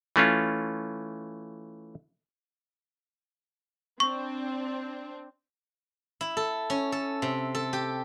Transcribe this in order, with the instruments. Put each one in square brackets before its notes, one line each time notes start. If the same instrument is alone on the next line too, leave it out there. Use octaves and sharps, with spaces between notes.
[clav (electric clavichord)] E3 A3 C#4 F4
[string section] C4 D4 [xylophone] C#6
[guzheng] E4
A4
C#4
A4
C3
A4
G4